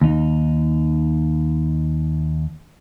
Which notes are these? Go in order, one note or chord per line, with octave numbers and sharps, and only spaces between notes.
D#2 D#4